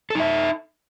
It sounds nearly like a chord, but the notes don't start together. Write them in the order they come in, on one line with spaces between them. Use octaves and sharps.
A4 D#4 E5